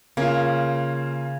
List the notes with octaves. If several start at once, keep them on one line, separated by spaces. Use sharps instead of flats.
C#3 A#3 F4